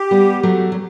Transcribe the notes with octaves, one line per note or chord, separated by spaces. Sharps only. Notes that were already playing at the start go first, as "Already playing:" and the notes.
Already playing: G4
G3 B3
F#3 A3
F#3